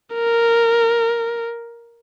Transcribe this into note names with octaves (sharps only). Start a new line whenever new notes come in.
A#4